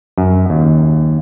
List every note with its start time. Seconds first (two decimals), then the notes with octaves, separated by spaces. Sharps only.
0.18 F#2
0.50 D#2